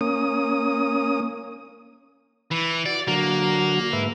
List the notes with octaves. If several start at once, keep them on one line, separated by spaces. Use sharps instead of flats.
A#3 C#4 D#6
E3
F#4 D5
D3 F#3 A#3 F#4
G#2 B4 E5